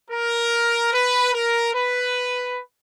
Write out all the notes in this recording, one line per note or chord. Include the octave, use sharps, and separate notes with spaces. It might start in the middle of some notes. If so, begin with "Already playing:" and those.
A#4
B4
A#4
B4